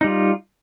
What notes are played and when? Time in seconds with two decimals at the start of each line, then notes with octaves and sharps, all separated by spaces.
0.01 D#4
0.04 G3
0.07 F4